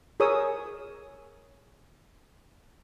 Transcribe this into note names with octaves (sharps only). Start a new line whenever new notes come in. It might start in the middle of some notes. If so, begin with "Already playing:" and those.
G#4 A#4 C#5 D#6 E6